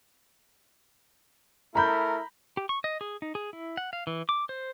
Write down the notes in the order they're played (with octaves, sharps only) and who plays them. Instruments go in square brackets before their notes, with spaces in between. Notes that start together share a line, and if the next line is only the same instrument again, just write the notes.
[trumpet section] A3 E4 A#4 [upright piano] A#5 B5 G6
[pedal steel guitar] G4
C#6
D#5
G#4
D#4
G#4
E4
F#5
F5
E3
D6
C5